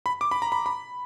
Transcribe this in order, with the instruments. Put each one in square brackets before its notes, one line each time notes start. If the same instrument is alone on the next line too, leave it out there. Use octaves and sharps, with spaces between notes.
[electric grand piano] B5
D6
B5
A#5
B5
B5